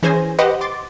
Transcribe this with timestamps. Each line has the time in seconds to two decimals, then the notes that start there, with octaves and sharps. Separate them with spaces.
0.03 E3 C#4 G#4 C5 G#5 A#6
0.39 G4 B4 C5 D#5 F#5
0.61 C6 D6 A6